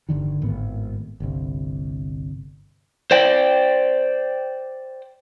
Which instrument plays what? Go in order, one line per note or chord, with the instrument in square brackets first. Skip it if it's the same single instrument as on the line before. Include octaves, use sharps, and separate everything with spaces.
[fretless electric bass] G1 D3 D#3
G#1 A2 B3
G1 C2
[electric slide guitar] C5 D5 G5